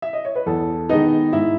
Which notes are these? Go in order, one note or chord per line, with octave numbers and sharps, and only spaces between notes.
E5
D#5
C#5
B4
E2 A4
D#3 G#3 B3 D#4 D#5
G#2 E4 E5